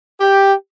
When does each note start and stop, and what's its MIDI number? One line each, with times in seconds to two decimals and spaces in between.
0.20 0.53 67